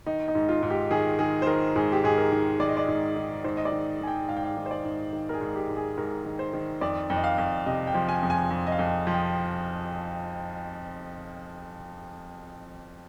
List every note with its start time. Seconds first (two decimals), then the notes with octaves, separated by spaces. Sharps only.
0.06 D#3 D#4
0.28 D#4
0.35 G#2
0.49 F4
0.63 G#2
0.70 G4
0.91 D#3 G#4
1.19 D#3 G#4
1.42 C5
1.47 D#3 A#4
1.75 G#2 G#4
1.92 G4
2.04 G#2 G#4
2.18 A#4
2.32 D#3
2.60 D#3 D5
2.68 D#5
2.77 D5
2.88 G#2
3.16 D#3
3.44 G#2 C5
3.57 D#5
3.65 D5
3.72 D#3
4.01 D#3 G#5
4.08 G5
4.29 G#2 F5
4.36 G5
4.44 F5
4.57 D#3
4.66 C5
4.71 D5
4.85 G#2
5.13 D#3
5.29 A#4
5.33 G#4
5.41 G#2
5.56 G4
5.69 G#2
5.76 G#4
5.97 G#2 A#4
6.25 D#3
6.39 C5
6.53 D#3
6.81 F2 D5
7.10 F2
7.16 D#5
7.24 F5
7.38 F2
7.66 C3 D#5
7.87 G5
7.94 F3
8.09 G#5
8.23 F2
8.30 G#5
8.50 F2
8.67 D#5
8.72 F5
8.79 F2
9.07 F3
9.14 G5